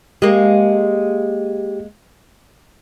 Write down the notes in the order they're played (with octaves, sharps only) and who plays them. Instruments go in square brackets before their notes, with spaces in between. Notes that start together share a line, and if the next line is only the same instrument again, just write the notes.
[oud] G#3 A#3 [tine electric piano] G4